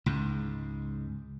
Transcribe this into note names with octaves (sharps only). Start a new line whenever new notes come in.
C#2 G#2